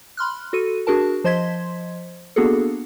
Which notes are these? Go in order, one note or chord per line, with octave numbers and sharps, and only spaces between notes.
B5 C6 F6 F#6
F#4 A4 D#7
D4 F#4 G#4 A#4 A5
F3 C5 D#5 C6 G#6 B6
A#3 B3 D4 F#4 G#4 A4